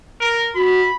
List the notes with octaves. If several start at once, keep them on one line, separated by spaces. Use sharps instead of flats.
A#4
F#4 B5